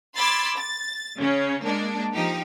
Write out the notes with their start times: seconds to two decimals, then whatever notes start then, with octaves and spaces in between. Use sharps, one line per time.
0.14 B5 C6 D6 E6 G#6 A6
0.57 A6
1.18 C#3 C#4
1.64 G#3 A#3 D4
2.14 F3 D#4 G4